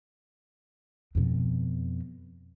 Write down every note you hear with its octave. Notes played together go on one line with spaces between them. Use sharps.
F2 B2